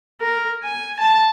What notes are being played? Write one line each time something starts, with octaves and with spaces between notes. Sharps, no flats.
A#4
G#5
A5